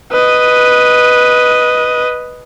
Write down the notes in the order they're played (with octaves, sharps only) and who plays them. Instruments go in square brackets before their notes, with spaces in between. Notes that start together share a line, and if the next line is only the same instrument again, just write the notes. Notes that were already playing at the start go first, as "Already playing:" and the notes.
[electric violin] B4 D#5